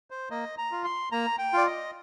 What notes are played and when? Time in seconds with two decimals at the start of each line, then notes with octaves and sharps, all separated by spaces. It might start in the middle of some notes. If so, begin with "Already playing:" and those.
0.10 C5
0.30 A#3 D#5
0.58 A#5
0.72 F4
0.85 C6
1.12 A#3 A#5
1.39 G5
1.53 F4 D5
1.66 D#5